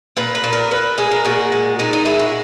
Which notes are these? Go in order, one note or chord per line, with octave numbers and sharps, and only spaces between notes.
A#2 B4
B4
A#2
A#4
A#2 B4
G#3 G#4
A#4
A#2 F#4
G#3
A#2 D#4
D#4
G#3 E4
F#4